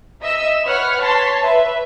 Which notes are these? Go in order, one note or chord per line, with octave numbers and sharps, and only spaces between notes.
D#5 E5 E6
B4 C#5 F#5 B5 F6
C#5 A5 C6 B6
B4 E5